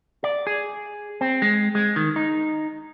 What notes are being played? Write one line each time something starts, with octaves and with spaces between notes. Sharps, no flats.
D5
G#4
C4
G#3
G#3
D#3
D#4